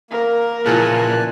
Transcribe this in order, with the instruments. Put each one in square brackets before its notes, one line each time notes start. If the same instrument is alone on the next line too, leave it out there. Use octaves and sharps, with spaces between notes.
[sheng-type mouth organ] A#3 [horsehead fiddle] A#4
[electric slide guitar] A#2 [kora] C#3 E3 F3 [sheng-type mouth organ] G#5 A5 F#6